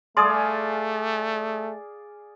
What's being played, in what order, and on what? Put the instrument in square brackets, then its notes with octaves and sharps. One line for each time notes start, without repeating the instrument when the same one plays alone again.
[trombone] A3 [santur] G#4 D5 F5 [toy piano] C6 D#6